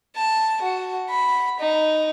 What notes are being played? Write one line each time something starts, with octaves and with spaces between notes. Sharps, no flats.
A5
F#4
B5
D#4